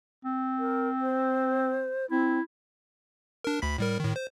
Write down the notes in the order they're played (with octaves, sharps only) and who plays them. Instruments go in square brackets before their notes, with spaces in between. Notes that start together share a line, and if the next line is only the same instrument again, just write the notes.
[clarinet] C4
[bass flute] A#4
C5
[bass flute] C4 [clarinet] E4
[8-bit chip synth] D4 A#4
D2 B5 B6
A2 G3 A#4
A2 D#3
C5